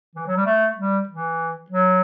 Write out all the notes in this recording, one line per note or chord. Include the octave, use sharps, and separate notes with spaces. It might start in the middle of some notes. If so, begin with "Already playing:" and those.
E3
F#3
G3
A3
G3
E3
F#3